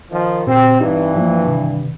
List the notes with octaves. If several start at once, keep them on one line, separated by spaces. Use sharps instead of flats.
D#3 F3
A#2 C4 G4
G2 E3 C4 D#4 G4
F3 A#3
C3 D#3